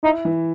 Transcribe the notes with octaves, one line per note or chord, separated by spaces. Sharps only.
D#4 E4
E3